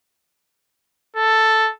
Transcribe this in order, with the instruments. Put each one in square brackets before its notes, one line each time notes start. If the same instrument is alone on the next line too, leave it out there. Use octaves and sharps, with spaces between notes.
[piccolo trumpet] A4